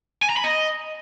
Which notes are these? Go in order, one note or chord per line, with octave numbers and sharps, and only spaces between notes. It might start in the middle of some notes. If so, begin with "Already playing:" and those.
G#5
A#5
B5
D#5